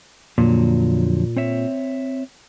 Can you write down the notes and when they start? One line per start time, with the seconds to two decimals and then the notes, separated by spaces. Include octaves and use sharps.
0.38 F2 A#2 D3 F#3
1.37 C4 C#5 E5